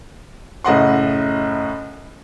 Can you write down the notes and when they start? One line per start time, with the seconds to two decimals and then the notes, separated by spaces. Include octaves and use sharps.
0.64 F#1 A2 D#5 F#5 C6